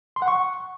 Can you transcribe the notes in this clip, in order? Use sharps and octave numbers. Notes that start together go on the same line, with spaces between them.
C6
F#5
C#6